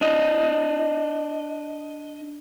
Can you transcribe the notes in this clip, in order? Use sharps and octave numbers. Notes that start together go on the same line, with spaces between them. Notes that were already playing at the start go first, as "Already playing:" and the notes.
D4 D#5